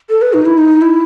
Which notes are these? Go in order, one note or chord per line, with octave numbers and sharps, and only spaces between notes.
A4
B4
D#4
E4
D#4
E4